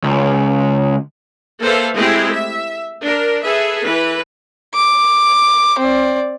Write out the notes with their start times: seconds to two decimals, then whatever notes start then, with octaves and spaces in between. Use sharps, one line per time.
0.04 C#2
1.62 A#3 A4 B4 C5 E5 F5
1.95 G#3 A3 C4 E4 G4 G#4
2.33 E5
3.03 D4 A#4
3.44 G#4 A4 B4 E5
3.83 E3 B4
4.75 D6
5.79 C4 D5